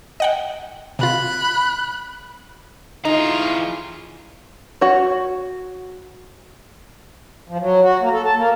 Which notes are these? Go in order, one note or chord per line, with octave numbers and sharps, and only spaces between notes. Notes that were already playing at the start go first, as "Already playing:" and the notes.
D#5 F#5 G5
C3 F4 B5 F#6
E3 D#4 F4 G#4 A#5
F#4 C#5
F3
F#3
F#4
A#3
A4
A5
A#3